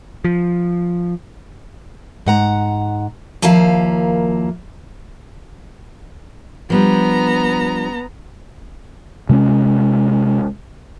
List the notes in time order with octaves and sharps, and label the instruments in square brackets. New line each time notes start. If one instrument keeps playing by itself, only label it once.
[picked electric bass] F3
[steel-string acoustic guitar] G#2 F#5 A#5
D#2 F3 A#3 E4 F5
[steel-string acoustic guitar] F3 G3 D4 [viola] B3 A#5
[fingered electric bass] C3 G#3 C4 C#4